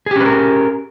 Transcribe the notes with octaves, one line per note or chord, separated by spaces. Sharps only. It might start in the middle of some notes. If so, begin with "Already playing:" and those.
C#4 G4 G#4 A#4 B4